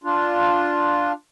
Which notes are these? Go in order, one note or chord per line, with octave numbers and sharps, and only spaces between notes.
D4 F4